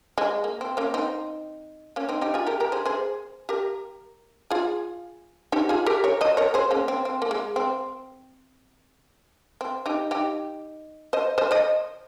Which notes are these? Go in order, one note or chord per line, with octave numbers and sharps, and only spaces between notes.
G#3
A#3
C4
A#3 C#4
C4 D#4
A#3 C#4
C4 D#4
D#4 G4
F4 G#4
G4 A#4
G4 A#4
G#4 C5
G#4 C5
G4 A#4
F4 G#4
D#4 G4
F4 G#4
G4 A#4
A#4 C#5
C5 D#5
A#4 C#5
G#4 C5
A#3 C#4
C4
C4
A#3
G#3
C4
C4
D#4 G4
D#4 G4
C5 D#5
C5 D#5
C5 D#5